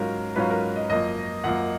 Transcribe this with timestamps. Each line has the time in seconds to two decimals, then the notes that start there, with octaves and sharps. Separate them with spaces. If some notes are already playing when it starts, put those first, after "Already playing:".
Already playing: G#2 F#3 C#4 F4 A#4
0.36 G#2 F#3 C#4 F4 B4
0.50 A#4
0.76 D#5
0.90 F#2 F3 A#3 D#5
1.44 F#2 F3 A#3 F#5